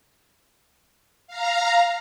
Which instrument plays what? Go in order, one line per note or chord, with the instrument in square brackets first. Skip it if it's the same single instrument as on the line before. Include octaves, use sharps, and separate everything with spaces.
[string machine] F5 A#5